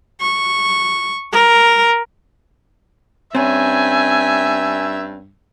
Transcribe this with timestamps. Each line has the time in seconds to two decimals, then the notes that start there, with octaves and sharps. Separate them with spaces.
0.21 C#6
1.32 A#4
3.35 G2 C4 C#4 E5 G#5